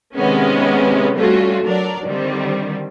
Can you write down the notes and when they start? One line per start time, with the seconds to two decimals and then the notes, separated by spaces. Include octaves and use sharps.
0.15 C3 D#3 G#3 B3 C#4
1.15 G3 A3 C#4 F4 F#4
1.63 F#3 D4 A#4 D5
2.06 D3 D#3 G3 C4